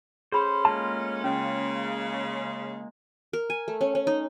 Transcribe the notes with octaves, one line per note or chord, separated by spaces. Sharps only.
A3 C#4 G#4 C5 B5
G#3 A#3 F4 A5
C#3 C#4
A#4
G#5
A3
C#4
C#4
D#4